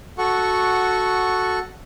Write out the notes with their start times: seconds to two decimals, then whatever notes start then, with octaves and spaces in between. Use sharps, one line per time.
0.18 F#4 A4 F#5 C#6